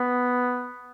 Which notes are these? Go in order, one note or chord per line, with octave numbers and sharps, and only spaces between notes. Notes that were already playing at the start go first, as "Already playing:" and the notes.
Already playing: B3